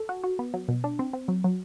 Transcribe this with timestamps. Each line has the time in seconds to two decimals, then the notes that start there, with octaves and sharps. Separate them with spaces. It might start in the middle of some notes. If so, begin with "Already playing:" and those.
Already playing: A4
0.09 F#4
0.24 F#4
0.39 B3
0.54 F#3
0.68 B2
0.84 D4
0.99 C4
1.13 C4
1.28 F#3
1.44 F#3